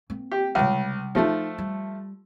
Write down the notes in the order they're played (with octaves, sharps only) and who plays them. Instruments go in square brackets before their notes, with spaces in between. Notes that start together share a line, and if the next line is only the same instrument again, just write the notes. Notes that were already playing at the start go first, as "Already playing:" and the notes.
[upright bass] A#3 C4
[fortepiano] G4
[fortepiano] C#2 [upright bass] C3 G3
[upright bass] G2 D#4 [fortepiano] F3 A3
[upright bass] G3